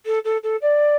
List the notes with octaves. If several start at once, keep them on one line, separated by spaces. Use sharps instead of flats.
A4
A4
A4
D5